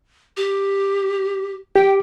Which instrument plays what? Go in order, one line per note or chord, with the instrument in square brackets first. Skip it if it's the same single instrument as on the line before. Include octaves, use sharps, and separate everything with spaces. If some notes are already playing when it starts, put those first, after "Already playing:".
[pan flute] G4
[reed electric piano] G4 [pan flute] G5